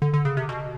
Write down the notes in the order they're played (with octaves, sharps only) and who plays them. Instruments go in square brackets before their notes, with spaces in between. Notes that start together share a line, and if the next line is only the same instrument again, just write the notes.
[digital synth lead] D3
D3
C#3
C3
B2